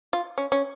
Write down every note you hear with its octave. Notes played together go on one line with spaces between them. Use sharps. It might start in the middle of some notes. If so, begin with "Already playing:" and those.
F4
C#4
C#4